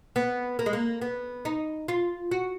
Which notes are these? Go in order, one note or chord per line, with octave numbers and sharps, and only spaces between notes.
B3
A#3
G#3
A#3
B3
D#4
F4
F#4